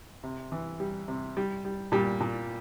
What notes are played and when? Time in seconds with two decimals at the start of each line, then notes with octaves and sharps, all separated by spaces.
0.23 C3
0.52 E3
0.80 G3
1.08 C3
1.37 G3
1.65 G3
1.92 A#2 G3
2.20 A#2